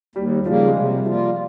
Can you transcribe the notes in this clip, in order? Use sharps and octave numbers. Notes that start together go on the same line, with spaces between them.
D#2 G3
C#3 F3 G3 A#3
G#3
C3 G3
F3 G3 A#3 F4